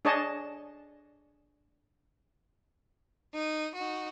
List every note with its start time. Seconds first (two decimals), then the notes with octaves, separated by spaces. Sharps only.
0.05 D4 G#4 C#5 D#5 A5
3.34 D#4 D#7
3.75 D#4 F#4